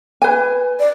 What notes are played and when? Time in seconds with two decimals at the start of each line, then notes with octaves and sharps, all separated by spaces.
0.22 B4 G#5
0.79 D5